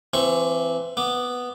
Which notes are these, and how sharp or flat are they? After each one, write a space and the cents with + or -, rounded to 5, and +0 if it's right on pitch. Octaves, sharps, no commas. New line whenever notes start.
E3 +25 C4 +0 C#6 +0
B3 +0 D6 +0